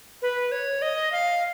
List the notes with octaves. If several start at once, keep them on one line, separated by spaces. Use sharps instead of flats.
B4
C#5
D#5
F5